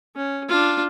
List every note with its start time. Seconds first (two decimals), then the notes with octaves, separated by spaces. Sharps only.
0.16 C#4
0.48 D4 F4